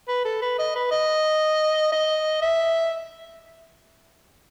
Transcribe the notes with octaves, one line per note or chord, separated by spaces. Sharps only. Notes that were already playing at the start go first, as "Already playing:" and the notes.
B4
A4
B4
D#5
B4
D#5
D#5
E5